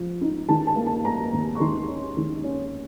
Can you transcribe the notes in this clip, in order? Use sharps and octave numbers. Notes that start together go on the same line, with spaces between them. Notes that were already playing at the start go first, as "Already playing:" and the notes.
Already playing: F3
D#4
D#3 A5
A5
A#3
A5
A#3 A#5
D#2
C#6
D#3 C6
C#4
D#3
C#4